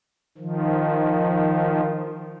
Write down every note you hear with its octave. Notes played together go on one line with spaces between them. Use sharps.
D#3 F3